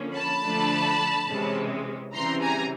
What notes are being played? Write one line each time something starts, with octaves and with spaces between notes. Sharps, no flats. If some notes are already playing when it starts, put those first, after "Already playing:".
Already playing: D3 F3 A#3 C#4
A5 B5
D3 F3 A3 D4
C3 E3 G#3 C#4
C#3 E3 G3 C4 A#5 C6
G#5 A#5